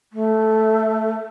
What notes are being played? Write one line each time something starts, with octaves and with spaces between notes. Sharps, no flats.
A3